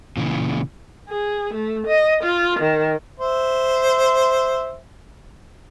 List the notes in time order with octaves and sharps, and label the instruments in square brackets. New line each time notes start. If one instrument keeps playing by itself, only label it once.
[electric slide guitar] A#2 C#3 E3
[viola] G#4
A3
D#5
F4
D#3
[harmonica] C5 E5